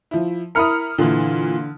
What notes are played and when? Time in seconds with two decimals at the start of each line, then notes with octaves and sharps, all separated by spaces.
0.11 F3 E4
0.55 E4 A#4 B5 D#6 F6 C#7
0.98 A#2 D3 E3